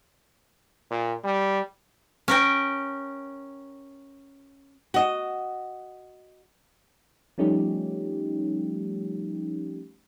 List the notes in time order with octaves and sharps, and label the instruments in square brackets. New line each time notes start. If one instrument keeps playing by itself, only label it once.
[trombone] A#2
G3
[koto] C#4 A#4 G5
[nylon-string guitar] F#4 D#5
[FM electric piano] F3 G3 A3 C#4 D#4 G4